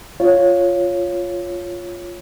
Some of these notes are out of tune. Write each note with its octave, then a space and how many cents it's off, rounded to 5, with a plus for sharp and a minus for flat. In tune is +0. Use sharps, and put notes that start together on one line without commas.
F4 +0 C#5 +0